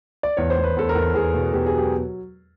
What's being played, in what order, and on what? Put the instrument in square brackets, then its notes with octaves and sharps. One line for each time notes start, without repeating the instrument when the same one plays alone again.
[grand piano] D5
E2 C#5
C5
E2
B4
E2 A4
A#4
E2
E2 G#4
B2
B2 G4
G#4
F#3
G4